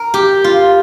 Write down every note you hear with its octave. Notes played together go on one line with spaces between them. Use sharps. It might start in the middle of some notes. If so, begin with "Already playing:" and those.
Already playing: A#4
G4
F4